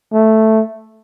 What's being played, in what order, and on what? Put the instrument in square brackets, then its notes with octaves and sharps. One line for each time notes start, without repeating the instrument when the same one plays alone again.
[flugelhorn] A3